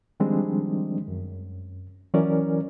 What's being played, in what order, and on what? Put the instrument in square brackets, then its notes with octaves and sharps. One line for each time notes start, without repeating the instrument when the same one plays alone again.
[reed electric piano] D#3 F3 G3 G#3 C4 D4
F#2
E3 F#3 C#4 A#4 D5